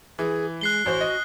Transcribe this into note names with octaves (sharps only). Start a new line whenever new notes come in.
E3 G#4
G#3 F#6 C7 G7
A1 F#4 C5
D#5